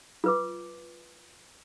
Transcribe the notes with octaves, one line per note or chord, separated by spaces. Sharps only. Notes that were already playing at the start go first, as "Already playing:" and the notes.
F4 B4 D6